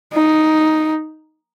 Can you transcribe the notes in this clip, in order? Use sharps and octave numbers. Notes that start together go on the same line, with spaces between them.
D#4